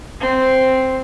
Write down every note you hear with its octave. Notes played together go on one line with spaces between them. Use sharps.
C4